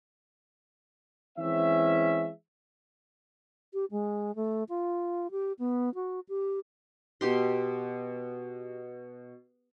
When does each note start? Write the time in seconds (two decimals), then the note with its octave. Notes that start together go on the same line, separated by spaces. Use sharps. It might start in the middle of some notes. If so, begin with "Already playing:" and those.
1.38 E3 G#3 C4 C#4 E5
3.74 G4
3.91 G#3
4.36 A3
4.69 F4
5.31 G4
5.59 B3
5.95 F#4
6.29 G4
7.21 B2 G4 C6